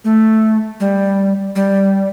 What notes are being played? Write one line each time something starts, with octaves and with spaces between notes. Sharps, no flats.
A3
G3
G3